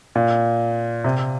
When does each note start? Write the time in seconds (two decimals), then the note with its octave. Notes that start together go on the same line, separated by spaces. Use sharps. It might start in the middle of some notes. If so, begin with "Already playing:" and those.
0.15 A#2
1.04 C3